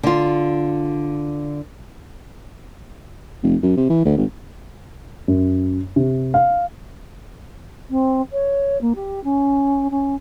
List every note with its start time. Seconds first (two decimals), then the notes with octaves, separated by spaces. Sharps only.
0.03 D3 F4
3.43 F1
3.63 F#2
3.77 C3
3.90 E3
4.05 D2
4.17 G#1
5.28 F#2
5.96 C3
6.34 F5
7.90 C4
8.32 C#5
8.81 A#3
8.95 G4
9.24 C#4
9.91 C#4